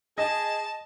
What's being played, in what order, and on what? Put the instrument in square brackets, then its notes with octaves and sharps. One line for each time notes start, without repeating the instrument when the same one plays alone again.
[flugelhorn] G#4 [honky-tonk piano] D#5 [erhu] A5